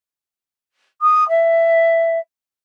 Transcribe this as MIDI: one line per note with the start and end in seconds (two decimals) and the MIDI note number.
1.01 1.27 87
1.29 2.18 76